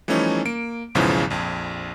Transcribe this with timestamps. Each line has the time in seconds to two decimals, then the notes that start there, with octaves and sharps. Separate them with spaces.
0.08 E3 F3 G3 A3 C#4 D#4
0.45 A#3 D7
0.95 B1 E2 G#2 C#3 E3 F3
1.30 A#1 F2